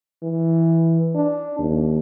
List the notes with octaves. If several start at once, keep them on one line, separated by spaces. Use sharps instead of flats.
E3
D4
D#2